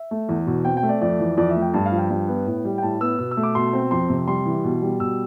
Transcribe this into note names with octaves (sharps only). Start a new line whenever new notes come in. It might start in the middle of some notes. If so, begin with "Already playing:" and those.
Already playing: E5
A3
E2
B2
C4 G5
G5
A3
D5
F2 D5
E3
F2 D5
E5
A3
G5
G2 A5
F5
F3
G5
G2
B3
A2
G3
G5
A2 A5
B3 E6
B2 E6
E6
A3
D6
B2 C6
C4
F2 C6
C3
G3 C6
E3
B2
G3
B2 E6